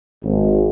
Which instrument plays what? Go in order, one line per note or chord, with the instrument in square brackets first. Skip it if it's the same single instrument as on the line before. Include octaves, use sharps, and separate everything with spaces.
[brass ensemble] G#1